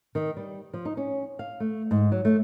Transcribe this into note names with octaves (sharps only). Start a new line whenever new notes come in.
D#3
G3
F3
D#4
C#4
F5
A3
G#2
F#3
A3